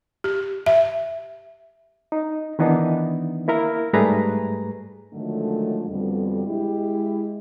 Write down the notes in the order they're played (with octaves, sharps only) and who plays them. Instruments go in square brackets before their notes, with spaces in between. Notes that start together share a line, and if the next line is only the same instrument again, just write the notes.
[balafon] G4
E5
[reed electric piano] D#4
D#3 E3 B3 D4 D#4
A#3 E4 A#4
G#2 G3 A3 G#4 B4 A#5
[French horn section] D3 D#3 F3 F#3 G#3 A3
F2 B2 D3 G3
G#3 E4 G4